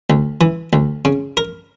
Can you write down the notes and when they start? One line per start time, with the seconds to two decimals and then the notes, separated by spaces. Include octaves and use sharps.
0.10 D2
0.41 E3
0.73 D2
1.05 C#3
1.37 A#4